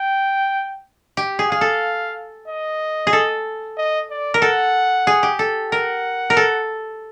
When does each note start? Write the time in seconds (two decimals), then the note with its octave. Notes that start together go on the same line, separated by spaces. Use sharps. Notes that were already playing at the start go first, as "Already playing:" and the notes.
Already playing: G5
1.17 G4
1.39 G#4
1.50 G#4 F5
1.61 A4
2.47 D#5
3.07 G#4
3.13 A4
3.77 D#5
4.10 D5
4.34 A#4
4.42 A4 F#5
5.07 G#4
5.23 G4
5.39 A4
5.72 A#4 F#5
6.30 A#4
6.37 A4